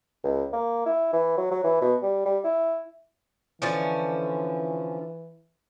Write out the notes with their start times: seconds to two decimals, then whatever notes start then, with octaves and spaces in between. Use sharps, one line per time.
0.24 C#2
0.53 A#3
0.86 E4
1.13 E3
1.37 F#3
1.51 F#3
1.64 E3
1.81 B2
2.02 G3
2.25 G3
2.44 E4
3.62 D3 E3 F3 C#4